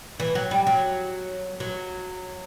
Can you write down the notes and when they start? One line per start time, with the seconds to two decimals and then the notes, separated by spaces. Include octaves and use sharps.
0.20 E3
0.35 F#3
0.51 G3
0.67 F#3
1.60 F#3